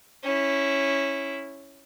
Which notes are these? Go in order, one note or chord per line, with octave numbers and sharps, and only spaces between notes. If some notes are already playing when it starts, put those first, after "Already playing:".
C#4 E4